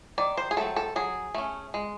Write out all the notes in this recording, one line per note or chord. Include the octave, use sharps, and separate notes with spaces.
D#3 D5
C5
G#4
F#3 A3 C4 A4
A4
F#3 G#4
A3 C#4
G#3